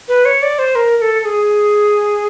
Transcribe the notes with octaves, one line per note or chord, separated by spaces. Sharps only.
B4
C#5
D5
C5
A#4
A#4
A4
A4
G#4